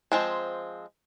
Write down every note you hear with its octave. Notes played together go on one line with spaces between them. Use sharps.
F3 G#3 C4